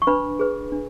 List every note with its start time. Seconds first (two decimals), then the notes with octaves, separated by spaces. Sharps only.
0.02 C#6
0.07 D4 B4 B5
0.39 G#4 B4
0.72 D4